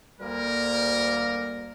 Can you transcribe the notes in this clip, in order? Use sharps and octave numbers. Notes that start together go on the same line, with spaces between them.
D2 G3 A#3 A#4